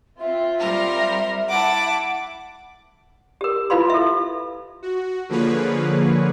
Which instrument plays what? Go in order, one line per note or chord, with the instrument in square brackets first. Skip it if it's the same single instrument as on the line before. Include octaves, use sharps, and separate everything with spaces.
[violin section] C4 F4 [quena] E5
[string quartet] G3 A#4 C5
[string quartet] E4 [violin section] F#5 A5 [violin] D6
[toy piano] G4 A#4
E4 F4 B4 F5 B5 C6
A4 E5
[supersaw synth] F#4
D3 F3 A#3 G#4 B4 C#5